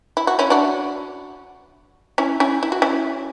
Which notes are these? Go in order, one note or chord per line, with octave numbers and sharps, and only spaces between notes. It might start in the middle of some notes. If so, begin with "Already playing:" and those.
E4
F#4
C#4 E4
D4 F#4
C#4 E4
C#4 E4
E4
F#4
C#4 E4